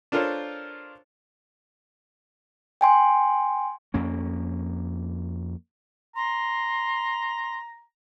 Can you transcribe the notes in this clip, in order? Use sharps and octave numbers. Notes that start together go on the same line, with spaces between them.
D4 F4 A4 A#4 C5 C#5
G5 G#5 C6
F2 A#3 C#4
A#5 C6